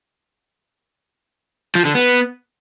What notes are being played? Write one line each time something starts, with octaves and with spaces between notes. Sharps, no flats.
F3
D3
B3